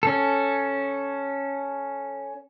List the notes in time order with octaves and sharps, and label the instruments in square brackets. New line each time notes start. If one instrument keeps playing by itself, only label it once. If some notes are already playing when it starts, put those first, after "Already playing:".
[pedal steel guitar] C#4 A4